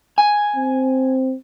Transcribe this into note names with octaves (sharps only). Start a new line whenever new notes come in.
G#5
C4